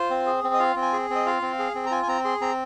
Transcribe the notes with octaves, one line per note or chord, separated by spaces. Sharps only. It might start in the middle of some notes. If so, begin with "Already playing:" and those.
Already playing: F4 C5
C4
G#4
C4
D#5
F4 F5
C4
G#5
G#4
C4
D#5
F4 F5
C4
G#4
C4
A#5
F4 G#5
G#5
C4 A#5
G#4 C6
C4 A#5